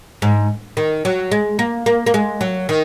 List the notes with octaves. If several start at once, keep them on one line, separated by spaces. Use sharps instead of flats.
G#2
D#3
F#3
G#3
A#3
A#3
A#3
G#3
F#3
D#3